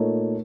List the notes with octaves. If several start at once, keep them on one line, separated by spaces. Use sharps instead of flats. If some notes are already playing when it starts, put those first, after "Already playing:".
Already playing: A#2 A3 D#4 A#4 C#5